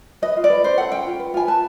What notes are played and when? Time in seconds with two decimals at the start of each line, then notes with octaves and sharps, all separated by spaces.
0.22 B4 D#5
0.36 F4
0.44 D5
0.50 B4
0.64 C#4 C5
0.78 A4 F#5
0.92 C#4 G5
1.06 F4
1.19 B4
1.34 F4 G#5
1.48 B4 A5